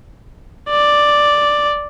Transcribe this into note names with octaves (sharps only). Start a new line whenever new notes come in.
D5